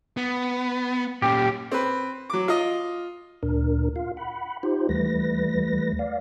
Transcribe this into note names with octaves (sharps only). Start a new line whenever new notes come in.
B3
A#2 C#4 G4
C4 B4
F#3 D6
F4 D#5
D2 A#2 D4 A#4
F4 F5
F#5 B5
D#4 F4 G4 C5
D#2 E3 G3 A3 B4 A#6
D5 F5